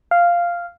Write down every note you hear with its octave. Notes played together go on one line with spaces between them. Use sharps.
F5